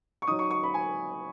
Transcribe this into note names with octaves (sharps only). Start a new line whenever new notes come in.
C#6
F#3 D#4 D#6
C#6
C#6
B5
G#5